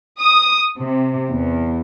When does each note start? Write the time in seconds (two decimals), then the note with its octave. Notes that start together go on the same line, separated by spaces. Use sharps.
0.21 D#6
0.77 C3
1.29 E2